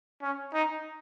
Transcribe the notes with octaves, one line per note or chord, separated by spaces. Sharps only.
C#4
D#4